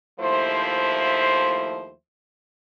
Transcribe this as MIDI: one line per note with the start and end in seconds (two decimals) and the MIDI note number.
0.20 1.92 39
0.20 1.92 53
0.20 1.92 57
0.20 1.92 64
0.20 1.92 72